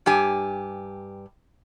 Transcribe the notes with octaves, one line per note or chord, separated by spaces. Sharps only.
G2 G4 G#5